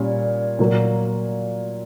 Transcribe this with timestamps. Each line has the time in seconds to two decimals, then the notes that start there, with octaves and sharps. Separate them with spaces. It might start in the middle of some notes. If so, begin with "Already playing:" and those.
Already playing: A#2 G3 C#4
0.59 A#2 F#3 A#3